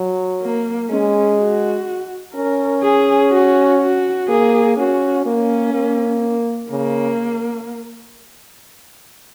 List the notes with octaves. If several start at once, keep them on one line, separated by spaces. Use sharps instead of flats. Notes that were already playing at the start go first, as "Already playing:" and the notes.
Already playing: F#3
A#3
G#3 C#4
F#4
C#4 A#4
G#4
F#4
F#4
A#3 G#4
C#4 F#4
A#3 C#4
A#3
C#3 A#3